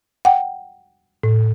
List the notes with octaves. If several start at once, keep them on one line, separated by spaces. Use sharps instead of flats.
F#5 G5
A2